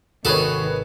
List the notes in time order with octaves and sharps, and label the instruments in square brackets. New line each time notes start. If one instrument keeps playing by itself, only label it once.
[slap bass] G#1 C3 [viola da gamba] D#3 [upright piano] F#4 B4 C#5 [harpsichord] G#4 A4